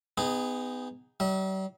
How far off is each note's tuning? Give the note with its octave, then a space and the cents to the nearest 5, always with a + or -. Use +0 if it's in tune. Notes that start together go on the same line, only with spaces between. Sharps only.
B3 +25 D#4 +0 G#4 -25
G3 -45 E5 -40